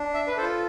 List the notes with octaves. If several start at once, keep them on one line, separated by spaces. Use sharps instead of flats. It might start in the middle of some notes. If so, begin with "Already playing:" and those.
Already playing: D4
E5
B4
F4 A4 C5